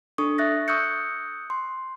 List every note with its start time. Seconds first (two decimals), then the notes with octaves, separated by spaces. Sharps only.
0.18 D4 A4 C#6 D#6
0.38 E5 F#6 A6 A#6
0.68 C#6 D#6 E6 F#6 G6 C#7
1.50 C6